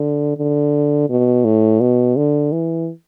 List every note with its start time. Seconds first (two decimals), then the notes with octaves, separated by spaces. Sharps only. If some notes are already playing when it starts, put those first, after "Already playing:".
Already playing: D3
0.38 D3
1.09 B2
1.44 A2
1.80 B2
2.17 D3
2.52 E3